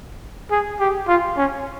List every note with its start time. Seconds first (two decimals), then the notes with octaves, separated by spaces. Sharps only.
0.51 G#4
0.80 G4
1.08 F4
1.37 C#4